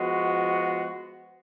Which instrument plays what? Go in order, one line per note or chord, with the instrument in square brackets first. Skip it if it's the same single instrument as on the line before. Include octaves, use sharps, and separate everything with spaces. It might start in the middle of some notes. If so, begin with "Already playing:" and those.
Already playing: [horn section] F3 G#3 B3 F#4